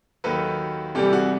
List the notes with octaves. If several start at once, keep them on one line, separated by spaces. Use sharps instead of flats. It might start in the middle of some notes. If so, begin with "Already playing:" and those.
D#2 D#3 F#3 A4 B4
C2 C3 E3 G3 G4 A4
F#4 G#4